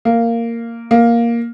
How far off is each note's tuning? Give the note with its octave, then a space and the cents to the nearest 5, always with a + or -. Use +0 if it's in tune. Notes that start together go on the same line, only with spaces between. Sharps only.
A#3 -10
A#3 +5